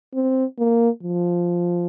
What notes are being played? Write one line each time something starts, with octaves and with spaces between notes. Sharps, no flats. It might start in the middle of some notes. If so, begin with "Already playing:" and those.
C4
A#3
F3